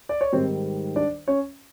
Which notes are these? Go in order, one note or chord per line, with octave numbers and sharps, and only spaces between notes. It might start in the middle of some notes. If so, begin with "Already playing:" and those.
D5
C#5
G#2 D#3 G3 C4 C5
D4 D5
C#4 C#5